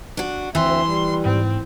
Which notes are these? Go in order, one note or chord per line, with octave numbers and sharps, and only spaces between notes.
D4 F#4
D2 E3 C4 E5 C6
G3
G#2 C4